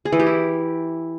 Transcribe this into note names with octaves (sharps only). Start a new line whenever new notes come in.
G#4
E3
G4
E4